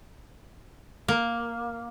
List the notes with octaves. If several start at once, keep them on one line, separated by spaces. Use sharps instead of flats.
A#3